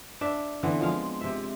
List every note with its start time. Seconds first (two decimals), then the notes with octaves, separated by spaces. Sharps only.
0.21 D4 D5 E5
0.63 D3 E3 B3 C4
0.80 F3 G#3 F5
1.21 C3 E5